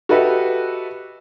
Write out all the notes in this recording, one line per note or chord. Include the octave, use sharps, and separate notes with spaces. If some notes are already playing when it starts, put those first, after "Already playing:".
F#4 G4 A4 B4 D#5 E5